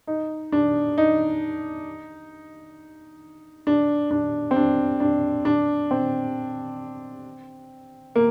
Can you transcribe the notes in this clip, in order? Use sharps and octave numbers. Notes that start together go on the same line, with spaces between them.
D#4
D4
D#4
D4
D4
C4
D4
D4
D4
C4
A#3